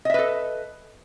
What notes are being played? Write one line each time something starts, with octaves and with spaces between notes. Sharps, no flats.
A4 B4 D#5 E5